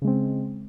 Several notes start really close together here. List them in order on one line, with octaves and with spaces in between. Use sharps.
C#3 G#3 C4